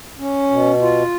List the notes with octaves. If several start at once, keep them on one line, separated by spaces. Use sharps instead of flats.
C#4
B2
F4